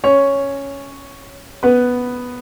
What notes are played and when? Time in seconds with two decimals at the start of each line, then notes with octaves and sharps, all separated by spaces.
0.04 C#4 C#5
1.63 B3 B4